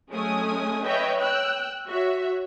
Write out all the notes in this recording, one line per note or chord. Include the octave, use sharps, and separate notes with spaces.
F#3 G#3 A3 C#4 G#5 D#6
B4 C#5 D#5 E5 G5
G5 E6 F#6
F#4 C#5 E5